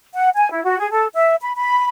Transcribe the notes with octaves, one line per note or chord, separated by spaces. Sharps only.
F#5
G#5
E4
F#4
G#4
A4
E5
B5
B5